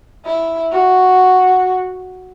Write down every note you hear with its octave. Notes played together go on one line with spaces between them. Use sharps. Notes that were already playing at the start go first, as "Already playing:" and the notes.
E4
F#4